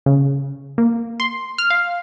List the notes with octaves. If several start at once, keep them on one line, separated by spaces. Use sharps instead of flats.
C#3
A#3
C6
F6
F5